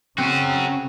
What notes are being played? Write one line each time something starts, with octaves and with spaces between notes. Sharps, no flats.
C#3 C4 C#4 F#4